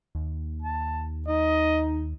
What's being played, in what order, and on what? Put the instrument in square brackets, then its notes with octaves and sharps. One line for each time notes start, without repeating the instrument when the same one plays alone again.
[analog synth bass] D#2
[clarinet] A5
[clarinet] D#4 [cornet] D#5